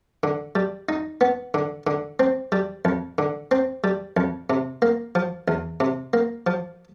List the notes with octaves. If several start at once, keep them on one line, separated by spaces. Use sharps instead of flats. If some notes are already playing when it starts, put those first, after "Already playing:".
D3
G3
D#4
B3
D3
D3
C4
G3
F2
D3
C4
G3
F2
C3
A#3
F3
E2
C3
A#3
F3